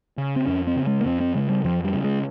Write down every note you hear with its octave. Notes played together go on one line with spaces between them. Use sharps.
C#3
C4
F2 C#4
C4
C#3
G#3
A#3
F2 C4
C4
C#3 G#3
G3
F2 F3
G3
C#3
G#3